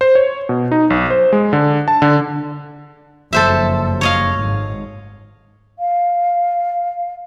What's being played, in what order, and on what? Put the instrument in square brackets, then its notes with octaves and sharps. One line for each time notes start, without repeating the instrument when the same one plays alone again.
[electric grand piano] C5
C#5
B2
D#4
B1
C5
G#3
D3
A5
D3
[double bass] F#1 F2 [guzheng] A4 C5 E5
[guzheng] C#5 D#5 F5
[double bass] G#1 G#2
[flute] F5